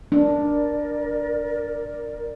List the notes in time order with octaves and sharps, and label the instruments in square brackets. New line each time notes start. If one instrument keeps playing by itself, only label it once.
[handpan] D4 [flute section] A#4 D5